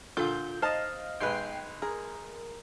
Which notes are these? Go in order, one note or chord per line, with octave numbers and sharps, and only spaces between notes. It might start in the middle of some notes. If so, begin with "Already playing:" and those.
A#2 D3 F4 A4 G6
D#4 C5 D#5 F5 A5
B1 G#3 B4 G5 C7
G#4 A#4